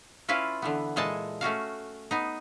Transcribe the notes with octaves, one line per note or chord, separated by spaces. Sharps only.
C#4 E4 F4 B4 F5
D3 E3 B3
A#2 E3 G#3 A4 G#5 A5
A3 C#4 F#4 F5
B3 D#4